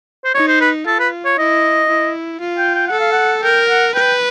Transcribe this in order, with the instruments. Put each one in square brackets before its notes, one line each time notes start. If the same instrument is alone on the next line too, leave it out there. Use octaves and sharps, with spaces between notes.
[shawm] C5
[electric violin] D#4 [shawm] C#5
[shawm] C5
B4
[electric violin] F4 [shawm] A4
[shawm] B4
C#5
[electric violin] E4 [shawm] D#5
[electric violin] E4
F4
[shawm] G5
G5
[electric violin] A4 [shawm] F#5
[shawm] F5
F#5
[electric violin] A#4 [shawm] G5
[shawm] F#5
[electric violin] B4 [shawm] G5